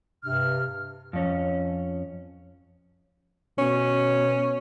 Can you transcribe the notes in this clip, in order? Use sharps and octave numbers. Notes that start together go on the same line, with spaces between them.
G2 C3 D4 F6
F2 C#4
B2 C#4